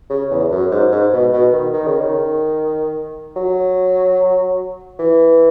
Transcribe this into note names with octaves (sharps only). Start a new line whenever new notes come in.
C#3
E2
F#2
G#2
G#2
B2
B2
D#3
D#3
C#3
D#3
F#3
E3